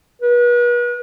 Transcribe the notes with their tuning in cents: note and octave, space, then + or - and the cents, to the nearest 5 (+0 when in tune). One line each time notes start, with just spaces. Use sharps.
B4 -40